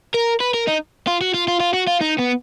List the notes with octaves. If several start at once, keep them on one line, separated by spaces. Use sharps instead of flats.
A#4
B4
A#4
D#4
F4
F#4
F4
F4
F4
F#4
F4
D#4
B3